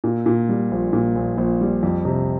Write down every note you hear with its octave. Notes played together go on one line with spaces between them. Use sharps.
A#2
A#2
G3
A#1
A#2
A#1
A#1
G3
F2
C3